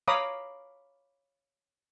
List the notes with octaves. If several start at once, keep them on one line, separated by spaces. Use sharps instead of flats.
C#5 F5 A#5 B5 D6 D#6